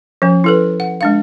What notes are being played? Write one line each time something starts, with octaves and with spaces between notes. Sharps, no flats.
F3 C#4
E4 A4 B4
F#5
G#3 D4 F5